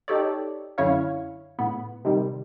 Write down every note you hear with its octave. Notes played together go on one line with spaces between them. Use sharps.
D#4 G4 A4 C#5 D5
F#2 D3 C#4 E4 C#5 F5
A2 B3
C3 D#3 G3